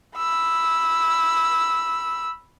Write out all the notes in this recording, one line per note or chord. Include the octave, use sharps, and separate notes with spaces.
B5 E6